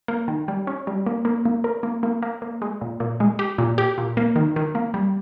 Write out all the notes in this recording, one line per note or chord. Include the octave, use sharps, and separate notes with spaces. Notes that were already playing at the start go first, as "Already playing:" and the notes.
A#3
D#3
G3
C#4
G3
A#3
A#3
A#3
A#4
A#3
A#3
A#3
A#3
G#3
A#2
A#2
G#3
G4
A#2
G4
A#2
A#3
D#3
D#3
A#3
G3